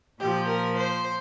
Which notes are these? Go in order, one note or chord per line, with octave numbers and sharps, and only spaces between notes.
A#2 F3 G4
A#4
C5